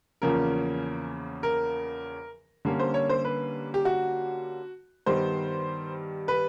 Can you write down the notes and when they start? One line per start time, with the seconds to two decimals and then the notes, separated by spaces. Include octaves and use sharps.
0.22 E2 C#3 F3 A#3 C#4 A#4
1.43 A#4
2.65 D3 G3 A#3 C#4
2.79 C5
2.94 C#5
3.09 C5
3.25 B4
3.74 G4
3.85 F#4
5.06 G2 D#3 G3 B3 C5
6.28 B4